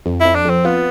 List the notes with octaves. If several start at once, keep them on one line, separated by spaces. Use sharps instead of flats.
F2
F2 E4
D4
F2 C4
B3 F4